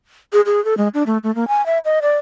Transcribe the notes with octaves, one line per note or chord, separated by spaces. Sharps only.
G#4
G#4
A4
G#3
D4
A3
A3
A#3
G#5
E5
D#5
D5